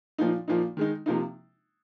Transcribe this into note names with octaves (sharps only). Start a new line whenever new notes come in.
A#2 F3 A#3 D#4
A#2 F3 A#3 D#4
D#3 G#3 D#4
C3 F3 A#3 D#4